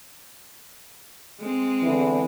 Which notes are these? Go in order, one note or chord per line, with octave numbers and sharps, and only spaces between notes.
G#3 C4
E2 D3 E3